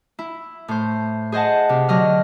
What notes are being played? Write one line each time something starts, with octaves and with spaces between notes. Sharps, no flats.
E4
A2 C5
G#4 C5 D#5 F#5 A5
C3
D3 F#3 D#5 F6